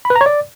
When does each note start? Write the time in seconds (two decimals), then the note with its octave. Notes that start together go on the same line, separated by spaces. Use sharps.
0.05 B5
0.10 B4
0.16 A#5
0.21 C#5
0.26 D5